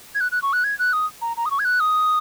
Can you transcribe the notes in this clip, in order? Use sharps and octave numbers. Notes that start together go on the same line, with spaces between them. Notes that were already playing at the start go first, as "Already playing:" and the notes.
G#6
F#6
F#6
C#6
F#6
G#6
F#6
D#6
A#5
A#5
D#6
C#6
G#6
F#6
D#6